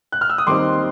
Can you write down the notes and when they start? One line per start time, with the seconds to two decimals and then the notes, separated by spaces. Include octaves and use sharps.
0.12 F#6
0.21 F6
0.30 E6
0.38 D#6
0.47 D#2 D#3 G3 C4 D#4 C6 D6